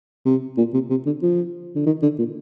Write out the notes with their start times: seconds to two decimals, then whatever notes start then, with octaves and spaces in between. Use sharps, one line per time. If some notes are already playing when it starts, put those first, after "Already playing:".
0.26 C3
0.58 A#2
0.74 C3
0.90 C3
1.06 D3
1.22 F3
1.76 D3
1.86 D#3
2.03 D3
2.19 A#2